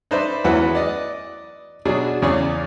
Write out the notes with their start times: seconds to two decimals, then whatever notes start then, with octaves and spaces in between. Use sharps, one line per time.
0.11 D#4 B4 C5 D5 E5
0.45 E2 E3 F#3 B4 E5 F#5
0.75 D5 D#5
1.85 B2 F#3 D4 F#4 G#4
2.22 E2 C#3 G#4 C#5 D5